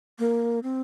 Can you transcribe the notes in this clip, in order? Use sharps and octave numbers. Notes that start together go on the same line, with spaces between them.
A#3
C4